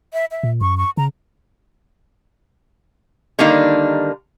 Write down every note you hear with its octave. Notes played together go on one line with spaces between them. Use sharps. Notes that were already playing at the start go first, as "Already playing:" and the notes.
E5
E5
A#2
F#2 C#6
C#6
C#3 A#5
D3 D#3 G3 A#3 D4 D#4